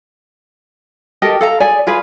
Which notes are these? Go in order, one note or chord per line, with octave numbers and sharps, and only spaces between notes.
G4 A4 A#4 D#5
A4 F5 A#5
G#4 D5 G#5
F4 G#4 B4 F5